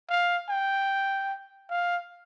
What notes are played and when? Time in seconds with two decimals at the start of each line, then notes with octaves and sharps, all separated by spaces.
0.09 F5
0.49 G5
1.69 F5